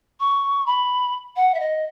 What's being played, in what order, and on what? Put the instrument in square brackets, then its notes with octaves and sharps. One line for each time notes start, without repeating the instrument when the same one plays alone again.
[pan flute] C#6
B5
F#5
E5
D#5